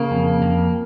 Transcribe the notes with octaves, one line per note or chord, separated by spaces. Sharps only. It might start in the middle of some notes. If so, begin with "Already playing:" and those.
Already playing: C#3 A#3
F2
F2